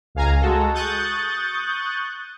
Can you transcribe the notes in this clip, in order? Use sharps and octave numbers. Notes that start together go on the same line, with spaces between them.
C#2 F5 G#5 A#5
G#3 F#4 A4
C#6 D#6 F#6 G6 A6